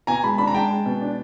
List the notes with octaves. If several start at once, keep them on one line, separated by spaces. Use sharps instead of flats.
B2 G#5 A#5
G#3 A5 B5
D4 A5 B5
A#5
G#3 G5 A5
G#3
B2
D4